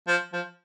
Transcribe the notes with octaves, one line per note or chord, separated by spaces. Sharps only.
F3
F3